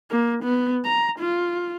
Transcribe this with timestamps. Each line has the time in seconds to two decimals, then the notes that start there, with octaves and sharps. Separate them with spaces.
0.10 A#3
0.43 B3
0.84 A#5
1.19 F4